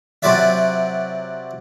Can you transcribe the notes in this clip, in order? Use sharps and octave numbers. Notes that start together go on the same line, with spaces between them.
C3 F#3 F4 D5 E5